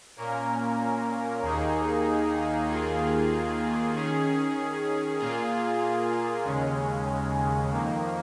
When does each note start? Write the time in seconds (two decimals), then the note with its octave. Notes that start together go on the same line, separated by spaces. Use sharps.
0.16 A#2 A#3 C#4 A#4
1.42 D#2 D#3 A#3 D#4 G#4
2.68 D#2 D#3 A#3 F4 G#4
3.93 D#3 C#4 G#4
5.19 A#2 A#3 F4 G#4
6.44 D#2 C#3 G#3 C#4
7.71 F2 D#3 A#3